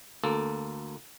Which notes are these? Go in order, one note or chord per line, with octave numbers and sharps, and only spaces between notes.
D2 A#3 A4